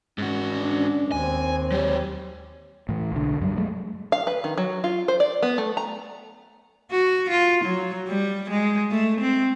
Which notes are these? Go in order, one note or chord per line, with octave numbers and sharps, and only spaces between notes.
G#2 C#4 F#4
D4
D#2 C4 G#5
F#3 G4 C#5
A2 E3
B1 D3
F#2 F#3 G3
F#3 G#3 A3
F5
B4
D#3
F#3
F4
C5
D5
B3
A3
A#5
F#4
F4
F#3
G3
G#3
A3
C4